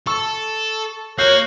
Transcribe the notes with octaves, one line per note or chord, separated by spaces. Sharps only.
A4 A5 C#6 E6
A#3 F#4 C#5 F6 G6 C7